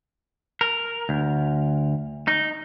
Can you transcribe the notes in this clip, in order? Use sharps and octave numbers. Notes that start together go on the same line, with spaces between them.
A#4
D2
D#4